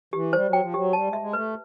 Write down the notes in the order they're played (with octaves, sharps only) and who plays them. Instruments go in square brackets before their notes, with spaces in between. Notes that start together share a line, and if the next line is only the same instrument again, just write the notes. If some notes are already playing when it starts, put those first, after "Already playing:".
[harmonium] E3 [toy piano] G4
[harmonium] G3 [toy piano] C5
[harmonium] F#3
[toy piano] G5
[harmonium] F3
[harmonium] F#3 [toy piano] G4
[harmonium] G3 [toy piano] A5
[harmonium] G#3
[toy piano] E5
[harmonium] G#3
[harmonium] A3 [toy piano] B4